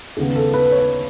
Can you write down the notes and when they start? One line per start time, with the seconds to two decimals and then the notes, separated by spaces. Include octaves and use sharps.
0.17 D#2 C#3 G#3 B3 G#4
0.35 A4
0.54 B4
0.72 C#5